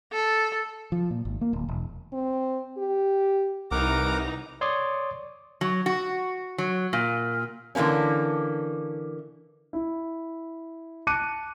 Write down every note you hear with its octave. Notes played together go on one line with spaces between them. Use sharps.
A4
F3
A#2
G#1
A#3
D1
E1
C4
G4
C2 E3 D#4 A#4 F#5 A#5 D6
C#5 D5 C6 D6 D#6
F#3
F#4
F#3
A#2
D3 E3 F3 A#3 C#4
E4
A5 D6 F#6 C#7 D#7